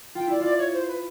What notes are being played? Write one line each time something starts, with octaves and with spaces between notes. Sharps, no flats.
F4 G5
E4 D5
F4 D5
C#5
C5
B4